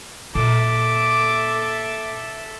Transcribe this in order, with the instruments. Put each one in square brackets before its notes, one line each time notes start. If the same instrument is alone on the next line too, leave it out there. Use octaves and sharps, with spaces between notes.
[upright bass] A#2 [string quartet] A4 E5 [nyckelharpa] D6